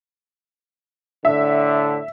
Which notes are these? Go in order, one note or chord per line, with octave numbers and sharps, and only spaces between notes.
A2 D3 E5